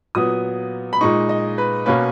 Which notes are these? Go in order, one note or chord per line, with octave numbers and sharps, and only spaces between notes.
A#2 F#3 B3 D#6
B5
A#2 G#3 D#4 C#6
D#5
B4
B2 A#3 C#4 B4